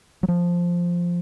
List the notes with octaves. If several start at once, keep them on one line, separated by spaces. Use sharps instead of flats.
F#3
F3